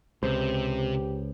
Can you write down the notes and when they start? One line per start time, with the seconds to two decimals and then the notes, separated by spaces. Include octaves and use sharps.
0.23 C#2 C3 G4 C5